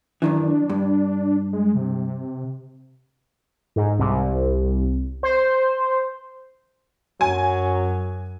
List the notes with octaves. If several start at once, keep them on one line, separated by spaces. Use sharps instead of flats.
F#2 D#3 E3 D4
G2
G#3
C3
G#2
C2
C5
F#2 F#3 G#5